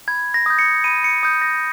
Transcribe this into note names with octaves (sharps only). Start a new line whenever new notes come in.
B5 G#6
A#6
D#6 G6
C#7
B5 D#7
C#7
D#6 G6
A#6